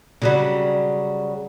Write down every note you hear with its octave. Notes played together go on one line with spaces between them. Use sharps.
C#3 F#3 G3